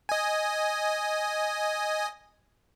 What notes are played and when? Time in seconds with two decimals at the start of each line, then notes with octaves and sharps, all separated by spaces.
0.09 D#5 G#5